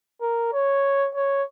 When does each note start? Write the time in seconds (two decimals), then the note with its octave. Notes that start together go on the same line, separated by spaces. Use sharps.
0.21 A#4
0.53 C#5
1.15 C#5